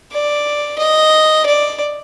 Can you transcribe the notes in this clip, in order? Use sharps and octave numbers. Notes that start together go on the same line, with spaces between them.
D5
D#5
D5